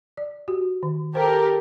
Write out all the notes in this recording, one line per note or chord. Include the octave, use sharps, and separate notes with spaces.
D5
F#4 G4
D#3
G4 A4 A#4 C5